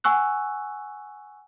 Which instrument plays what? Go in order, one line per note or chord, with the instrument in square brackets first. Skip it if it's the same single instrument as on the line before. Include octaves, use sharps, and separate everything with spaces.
[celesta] F#5 G#5 C#6 E6 F#6